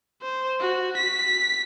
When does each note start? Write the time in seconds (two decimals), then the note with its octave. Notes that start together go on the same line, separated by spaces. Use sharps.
0.23 C5
0.60 F#4
0.97 B6